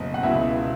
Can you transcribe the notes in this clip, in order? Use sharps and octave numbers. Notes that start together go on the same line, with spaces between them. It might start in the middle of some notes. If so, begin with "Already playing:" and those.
Already playing: F#1 B2 D#5
F#5
C#2 B2 E4 E5